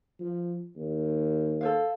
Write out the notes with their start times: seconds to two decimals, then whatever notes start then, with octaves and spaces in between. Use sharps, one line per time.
0.20 F3
0.76 D#2
1.61 A4 C5 F5